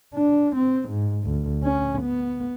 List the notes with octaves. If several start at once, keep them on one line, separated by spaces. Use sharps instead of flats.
D4
C4
G#2
D2
C#4
B3